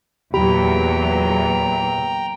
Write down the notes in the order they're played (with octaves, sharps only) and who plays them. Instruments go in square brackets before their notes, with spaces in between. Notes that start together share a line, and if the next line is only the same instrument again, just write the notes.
[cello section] E2 A#2 F#3 [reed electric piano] G4 B5 [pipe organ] G5 A#5